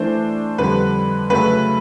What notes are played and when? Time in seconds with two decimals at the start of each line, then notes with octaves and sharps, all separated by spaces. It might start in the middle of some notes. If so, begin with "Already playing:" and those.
Already playing: E3 A3 D4 C5
0.58 F2 D3 G3 B4
1.30 C#3 F#3 A3 C#4 B4